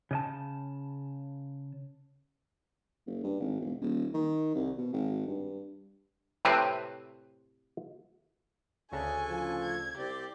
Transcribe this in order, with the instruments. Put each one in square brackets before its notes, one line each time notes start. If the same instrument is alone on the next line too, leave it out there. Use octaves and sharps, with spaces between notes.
[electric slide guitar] C#3 D#5 A5
[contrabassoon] F#1
G2
G#1
E1
D#1
D#3
C2
B2
G#1
G2
[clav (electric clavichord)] A2 C3 C4 B4
[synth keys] D2 C#3 [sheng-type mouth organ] D4 A4 C#6 [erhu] G#5
[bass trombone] F3
[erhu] G#6
[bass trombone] C2 [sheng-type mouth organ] C4 D5 [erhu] G4